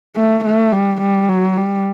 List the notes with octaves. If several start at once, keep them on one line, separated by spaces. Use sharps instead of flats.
A3
A3
G3
G3
F#3
G3